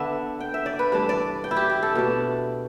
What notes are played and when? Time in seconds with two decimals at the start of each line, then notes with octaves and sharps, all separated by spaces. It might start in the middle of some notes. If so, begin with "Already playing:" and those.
Already playing: D3 B3 D4 E5
0.40 G5
0.54 E5
0.66 D5
0.79 B4
0.92 G2 E3 A3 D4
1.09 D5
1.44 G5
1.51 E4
1.57 G4
1.70 G4
1.83 A4
1.95 B2 A3 D4